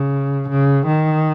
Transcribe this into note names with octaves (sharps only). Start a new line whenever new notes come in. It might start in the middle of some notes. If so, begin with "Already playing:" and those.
Already playing: C#3
C#3
D#3